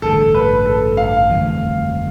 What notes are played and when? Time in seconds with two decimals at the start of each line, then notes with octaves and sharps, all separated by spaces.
0.02 A1 G2 D3 A4
0.35 B4
0.66 A4
0.97 F5
1.29 G1 F2 E3 A3